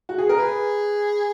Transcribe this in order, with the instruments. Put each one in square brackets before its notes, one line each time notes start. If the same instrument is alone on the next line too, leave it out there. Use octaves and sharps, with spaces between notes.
[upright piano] F#4
G#4
A#4
[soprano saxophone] G#4 [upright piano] B4